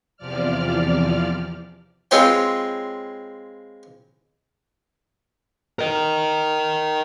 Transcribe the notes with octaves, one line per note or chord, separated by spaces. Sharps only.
E2 C3 F3 D5 F6
G#3 C4 F4 B4 C#5 G5
A#4 D#5